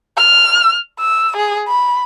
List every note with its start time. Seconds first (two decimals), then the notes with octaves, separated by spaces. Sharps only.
0.18 F6
0.99 E6
1.37 G#4
1.68 B5